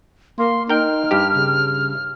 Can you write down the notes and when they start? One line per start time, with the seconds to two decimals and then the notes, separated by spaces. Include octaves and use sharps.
0.38 A#3 C6
0.69 D#4 A#4 G5 F6
1.11 G2 G4
1.35 C#3